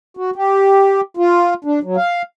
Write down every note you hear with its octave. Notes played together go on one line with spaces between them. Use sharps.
F#4
G4
F4
D4
F#3
F5